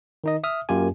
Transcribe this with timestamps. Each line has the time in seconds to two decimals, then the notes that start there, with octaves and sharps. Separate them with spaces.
0.24 D#3 D#4 D#5
0.44 E5 D#6 F6
0.69 F#2 A#3 F4 G4 G#5